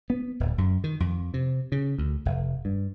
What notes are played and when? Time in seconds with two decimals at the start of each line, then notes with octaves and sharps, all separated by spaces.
0.10 B3
0.40 D1
0.58 F#2
0.84 D#3
1.00 F2
1.34 C3
1.72 C#3
1.98 D2
2.25 F1
2.65 G2